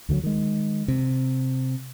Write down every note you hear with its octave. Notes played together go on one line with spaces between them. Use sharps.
D2 D3 E3 F#3
D#3 G#3
C3